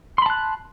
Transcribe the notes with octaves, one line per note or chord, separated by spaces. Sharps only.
A5 B5 C6 F#6